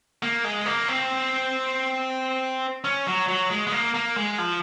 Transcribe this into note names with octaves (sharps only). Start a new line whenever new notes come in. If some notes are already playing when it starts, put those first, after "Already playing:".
A#3
G#3
A#3
C4
C#4
F#3
F#3
G#3
G#3
A#3
A#3
G#3
F3